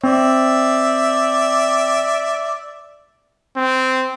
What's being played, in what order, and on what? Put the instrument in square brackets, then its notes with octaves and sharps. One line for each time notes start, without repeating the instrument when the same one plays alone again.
[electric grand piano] C4 [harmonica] D5 E5
[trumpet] C4